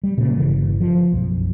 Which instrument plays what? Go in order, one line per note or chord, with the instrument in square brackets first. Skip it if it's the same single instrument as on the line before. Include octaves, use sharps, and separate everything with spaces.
[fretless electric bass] G3
A#2 C#3
G1 C#3 E3
F3
B1 F#2